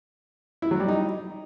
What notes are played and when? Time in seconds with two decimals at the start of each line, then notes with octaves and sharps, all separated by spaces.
0.62 E4
0.71 F#3
0.80 G3
0.88 D#4